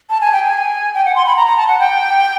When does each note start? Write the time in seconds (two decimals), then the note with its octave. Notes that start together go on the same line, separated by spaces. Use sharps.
0.10 A5
0.21 G#5
0.33 G5
0.44 G#5
0.94 G5
1.05 F#5
1.16 C6
1.26 B5
1.36 A#5
1.47 A#5
1.57 A5
1.68 F#5
1.80 G5